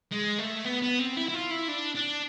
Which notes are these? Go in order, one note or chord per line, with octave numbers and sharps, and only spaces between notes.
G#3
A3
B3
B3
C4
E4
E4
F4
E4
D4
D4